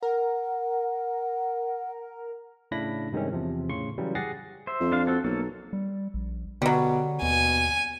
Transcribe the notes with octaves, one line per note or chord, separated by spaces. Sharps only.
A#4 F#5
A2 C#3 D4 E4 B5 A#6
G2 C3 D#3 G#3 C4 C#4
E2 C3 F3
A2 C#3 C6 C#6
C#3 E3 F#3 G3
G4 G#4 F#5 A6 A#6 C7
C5 E5
F2
D4 C5 F5
C4 F#4 A4
B1 A#3 A4 C#5
G3
A#1
B2 D3 F#3 G3
D#2 B2 G#5